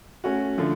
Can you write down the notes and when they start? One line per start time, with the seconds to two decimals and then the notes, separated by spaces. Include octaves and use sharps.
0.24 A3 C#4 F#4
0.58 D3 F3 A3